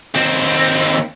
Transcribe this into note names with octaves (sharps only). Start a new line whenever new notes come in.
D#2 C4